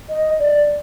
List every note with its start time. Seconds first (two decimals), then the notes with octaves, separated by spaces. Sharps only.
0.09 D#5
0.39 D5